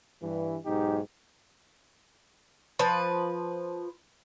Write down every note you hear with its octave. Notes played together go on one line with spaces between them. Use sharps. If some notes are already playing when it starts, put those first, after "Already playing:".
G2 E3
B1 G#2 D#4 G4
F3 B4